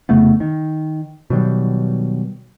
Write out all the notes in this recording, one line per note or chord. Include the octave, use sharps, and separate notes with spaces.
F1 C#3 A3 B3
D#3
B2 D#3 F#3 G3